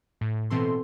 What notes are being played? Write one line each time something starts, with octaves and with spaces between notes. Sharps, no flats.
A2
B2 E3 C4 A4 C6